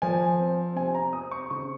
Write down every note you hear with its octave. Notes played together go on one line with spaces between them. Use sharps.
F3 G#5
C4
C3 G#5
A#5
C4 D#6
C#6
C#3 C#6